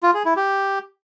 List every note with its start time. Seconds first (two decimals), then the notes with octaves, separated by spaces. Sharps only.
0.03 F4
0.14 G#4
0.25 E4
0.36 G4